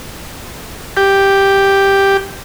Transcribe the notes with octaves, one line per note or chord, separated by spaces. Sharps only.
G4